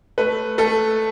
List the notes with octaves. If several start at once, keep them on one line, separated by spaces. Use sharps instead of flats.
A3 B4
A3 A4